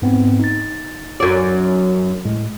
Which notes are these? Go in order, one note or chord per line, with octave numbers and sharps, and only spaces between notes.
G#2 B3 C4
D#4 A6
F#2 D5
A2 G#3